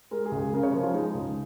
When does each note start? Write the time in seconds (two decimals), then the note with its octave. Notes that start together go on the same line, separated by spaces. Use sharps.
0.11 G#3 A#4
0.25 G#4
0.32 C#2
0.39 G#4
0.53 C#3 A#4
0.63 C#5
0.73 F3 A#4
0.83 F4
0.94 G#3 D#4
1.15 C#2